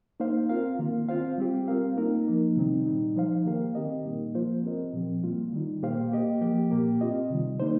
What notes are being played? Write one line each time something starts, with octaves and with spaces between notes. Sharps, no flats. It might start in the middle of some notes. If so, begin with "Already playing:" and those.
A#3 D#4 C5 F5
C4 F4 A#4 F5
D#3 A#3 F4
C4 F4 C5 F5
G3 C4 G4
G3 C4 F4 A#4 F5
A#3 D#4 A#4
F3 A#3 D#4
C3 D#3 G3 C4 D#4
A#2 G3 D#4
F3 D#4 C5 F5
D#3 A#3 G4 A#4 F5
D#3 C4 G4 A#4 D#5
A#2 G3 A#3 D#4
F3 A#3 F4 C5
C4 G4 A#4 D#5
A#2 F3 C4
G3 A#3 F4
D#3 G3 D#4
A#2 A#3 G4 C5 F5
A#3 G4 D#5
F3 A#3 G4
A#2 A#3 G4
C4 F4 D#5
C3 D#3 G3
G3 A#3 D#4 C5